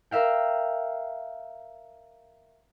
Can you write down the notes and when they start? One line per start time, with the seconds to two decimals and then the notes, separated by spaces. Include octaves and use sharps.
0.11 A#4 E5 F5 G5